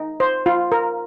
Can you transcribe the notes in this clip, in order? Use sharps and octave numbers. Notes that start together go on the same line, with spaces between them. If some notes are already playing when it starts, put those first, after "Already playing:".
Already playing: D#4
C5
F4
A#4